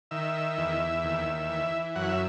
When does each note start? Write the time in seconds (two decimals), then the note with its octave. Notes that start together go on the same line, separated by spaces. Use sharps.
0.11 D#3 E5
0.58 E2
1.04 D#2
1.49 E3
1.96 F#2 F#5
2.09 E5